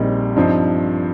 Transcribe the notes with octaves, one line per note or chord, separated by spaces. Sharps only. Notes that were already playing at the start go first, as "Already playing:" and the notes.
Already playing: A#1 A#2 G3 C4 D#4
G2 F3 C4 D#4